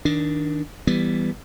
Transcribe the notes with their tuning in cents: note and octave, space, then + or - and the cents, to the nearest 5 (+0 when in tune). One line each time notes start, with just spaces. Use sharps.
D#3 +15 D4 +0
E3 +5 G3 +0 B3 +0